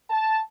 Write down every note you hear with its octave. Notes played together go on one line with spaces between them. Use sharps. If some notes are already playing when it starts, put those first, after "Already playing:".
A5